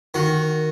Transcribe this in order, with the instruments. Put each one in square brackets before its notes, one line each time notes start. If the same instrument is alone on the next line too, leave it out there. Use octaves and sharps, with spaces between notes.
[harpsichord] D#3 F#4